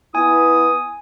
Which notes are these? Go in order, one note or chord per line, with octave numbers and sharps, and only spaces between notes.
B3 E4 G#5 D#6